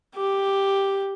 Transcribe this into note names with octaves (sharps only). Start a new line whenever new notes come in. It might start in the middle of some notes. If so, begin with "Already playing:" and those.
G4